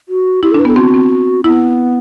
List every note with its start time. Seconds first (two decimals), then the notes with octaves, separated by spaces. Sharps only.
0.09 F#4
0.43 E4 G4
0.51 D4 A4
0.59 B4
0.65 B3 A4
0.76 C4 F#4
0.94 C4
1.44 B3 E4